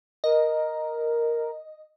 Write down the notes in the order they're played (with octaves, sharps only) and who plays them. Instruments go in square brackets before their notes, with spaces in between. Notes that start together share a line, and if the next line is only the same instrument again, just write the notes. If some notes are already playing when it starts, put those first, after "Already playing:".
[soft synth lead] A#4 [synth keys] D#5